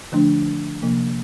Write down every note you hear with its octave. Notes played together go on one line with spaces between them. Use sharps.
D3 F3 A3 D4
C3 F3 A#3